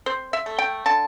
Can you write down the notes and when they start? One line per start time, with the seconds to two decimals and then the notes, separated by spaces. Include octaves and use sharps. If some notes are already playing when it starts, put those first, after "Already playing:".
0.06 C4 C5
0.33 E5
0.46 A3
0.59 G5
0.86 D3 A5